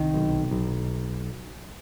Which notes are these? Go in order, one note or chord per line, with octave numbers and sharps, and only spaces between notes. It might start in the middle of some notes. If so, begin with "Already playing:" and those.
Already playing: C2 D#3
B1
B1